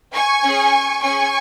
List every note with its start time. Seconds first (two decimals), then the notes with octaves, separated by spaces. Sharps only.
0.15 G#5 C#6
0.43 C#4 G#4
1.02 C#4 G#4 G#5 C#6